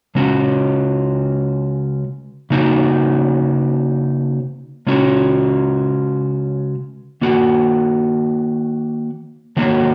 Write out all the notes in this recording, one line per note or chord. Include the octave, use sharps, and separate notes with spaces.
C#3 G#3 C#4 F#4
C#3 A#3 D#4 F#4
C#3 G#3 C#4 F#4
D#3 A#3 F#4
D#3 F#3 A#3 F#4